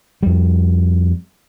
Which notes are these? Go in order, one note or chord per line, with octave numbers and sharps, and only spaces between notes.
F2 G3